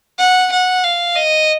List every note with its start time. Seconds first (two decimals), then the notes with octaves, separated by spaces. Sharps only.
0.19 F#5
0.52 F#5
0.84 F5
1.16 D#5